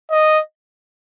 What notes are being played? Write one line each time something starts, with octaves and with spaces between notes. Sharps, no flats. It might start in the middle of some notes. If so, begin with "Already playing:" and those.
D#5